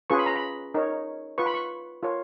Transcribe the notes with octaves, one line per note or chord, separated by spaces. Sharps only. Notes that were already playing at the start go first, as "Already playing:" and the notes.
C#4 F4 G#4 B4 C#6
B5
A#5
B5
D#4 A#4 C#5
F4 B4 C#6
B5
C#6
F4 A#4 C#5